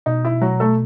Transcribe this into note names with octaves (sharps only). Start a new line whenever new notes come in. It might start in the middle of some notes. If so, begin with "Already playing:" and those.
B2 D#4
E4
F#3 F#4
A3 A4